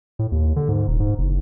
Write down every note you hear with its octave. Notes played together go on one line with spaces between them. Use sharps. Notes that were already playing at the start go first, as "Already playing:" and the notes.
A2
D#2
D3
G#2
D#1
G#2
F#1